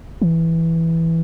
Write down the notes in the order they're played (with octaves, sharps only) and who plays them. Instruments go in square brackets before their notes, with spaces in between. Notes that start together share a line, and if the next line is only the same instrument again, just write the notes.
[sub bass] E3